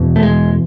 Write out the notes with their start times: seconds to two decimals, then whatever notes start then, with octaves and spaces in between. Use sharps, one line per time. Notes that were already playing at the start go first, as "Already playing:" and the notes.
Already playing: E2 B2
0.16 A3
0.23 G#3